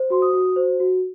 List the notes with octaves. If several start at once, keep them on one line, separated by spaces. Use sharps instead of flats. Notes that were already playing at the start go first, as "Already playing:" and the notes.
Already playing: C5
F#4 C6
D#6
F#4
C5
F#4